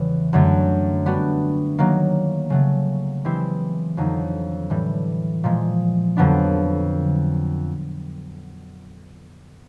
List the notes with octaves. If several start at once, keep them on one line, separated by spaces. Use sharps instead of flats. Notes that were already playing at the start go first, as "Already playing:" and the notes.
Already playing: E2 C#3 E3 G3
F#2 D3 F#3 A3
G3 B3 D4 F#4
D#3 F#3 A#3
C#3 F#3 A3
E3 G#3 C4 E4 G4
F2 D3 F#3 A#3 D#4
A2 E3 G3
A#2 F3 G#3
F2 D3 F#3 B3 D4